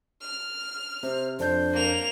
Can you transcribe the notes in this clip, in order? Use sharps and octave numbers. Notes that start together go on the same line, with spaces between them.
F6
C3 C5
F2 D4 C5 G6
A#3 F7